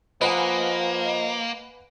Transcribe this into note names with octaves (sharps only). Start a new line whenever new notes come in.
F3 A#3 B4 D#5 F#5 G#5